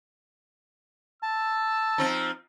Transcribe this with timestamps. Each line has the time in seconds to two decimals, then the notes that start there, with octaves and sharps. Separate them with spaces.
1.23 A5 E6
1.98 F3 C4 D#4